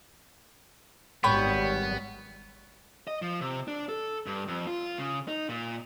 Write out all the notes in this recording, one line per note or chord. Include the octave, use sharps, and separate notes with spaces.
G#1 G3 B3 C#5 G5 B5
D#5
F3
C3
D4
A4
G2
F2
F4
C#3
D#4
A#2